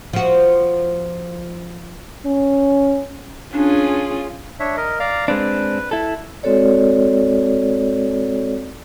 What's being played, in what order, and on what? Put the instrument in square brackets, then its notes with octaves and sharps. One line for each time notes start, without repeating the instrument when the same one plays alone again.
[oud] F3 F#4
[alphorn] C#4
[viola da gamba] C#4 F4 G#4 [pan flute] D4
[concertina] D4 C#5 E5
A#4 D#5
D5 F5 A#5
[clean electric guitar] G#3 C4 D4 [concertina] B4
[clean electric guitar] E4 A4
[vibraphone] G#3 C4 F#4 A4 C#5 D5